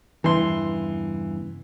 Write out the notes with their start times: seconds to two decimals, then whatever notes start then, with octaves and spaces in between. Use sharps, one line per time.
0.24 E2 G2 C#3 E3 C6